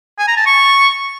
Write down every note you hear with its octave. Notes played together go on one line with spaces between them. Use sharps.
G#5
A#5
A5
C#6